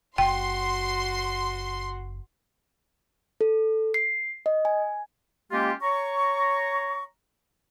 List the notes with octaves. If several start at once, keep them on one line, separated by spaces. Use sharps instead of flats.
F#1 F#4 G5 C6
A4
C7
D#5
G#5
G#3 A#3 C#4 F4 G4
C#5 A#5 C#6